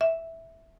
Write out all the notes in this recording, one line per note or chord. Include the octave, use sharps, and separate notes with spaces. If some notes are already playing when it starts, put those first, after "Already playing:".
E5